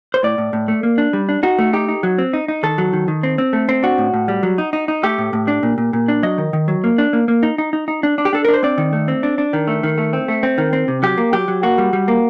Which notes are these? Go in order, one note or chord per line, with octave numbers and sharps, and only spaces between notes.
C5
A2 D5
A2
A2
A3
A#3
D4
G3
D4
D#4 F#4
A3
D#4 G4
D#4
F#3
C4
D#4
D#4
D#3 A4
F#3
D#3
D#3
C4
C4
A3
C4
D4 F#4
A2
A2
G3
F#3
D#4
D#4
D#4
A3 G4
A2
A2
D4
A#2
A#2
A#2
D4
F#3 D#5
D#3
D#3
F#3
A#3
D4
A#3
A#3
D#4
D#4
D#4
D#4
D4
D4
G4
D4 A4
D4 A#4
C5
C4 D5
D#3
A3
C4
D4
D4
D#3
A3
D#3
A3
C4
A3
C4
D#3
C4
C3
F#3 G4
A#3
F#3 G4
F#3
A#3 F#4
G3
G3
A#3